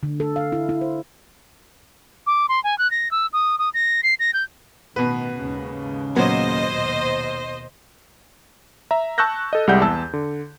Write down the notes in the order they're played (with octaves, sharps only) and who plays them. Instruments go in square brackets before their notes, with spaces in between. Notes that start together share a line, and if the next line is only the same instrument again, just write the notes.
[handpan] D3
A4
F5
E4
E4
C5
[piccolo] D6
C6
G#5
F#6
A#6
E6
D#6
D#6
A#6
C7
A#6
G6
[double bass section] A1 D#3 B3 [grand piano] B2 B4
[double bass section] D#2 G#2 C#3
[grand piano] A#2 F#3 B3 [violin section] C5 D#5
[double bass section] D#2 B2
[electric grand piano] E5 A#5
A5 C#6 E6 F#6 G6 A#6
A4 D#5
C2 G3 G#3 F#5 G6
E2 A5 E6
D3